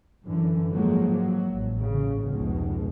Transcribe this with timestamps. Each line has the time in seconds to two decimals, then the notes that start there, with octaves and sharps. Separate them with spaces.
0.24 F#2 D3 E3
0.72 G#2 F3 F#3 G#3 A#3
1.10 F#3
1.53 A1
1.84 C#3
2.23 F1 C#2 B2 G#3